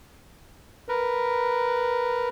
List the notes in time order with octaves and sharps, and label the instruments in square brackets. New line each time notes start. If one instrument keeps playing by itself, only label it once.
[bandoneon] A#4 B4